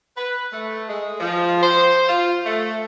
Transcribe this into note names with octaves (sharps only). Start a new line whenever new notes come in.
B4
A3
G#3
F3
C5
F4
A3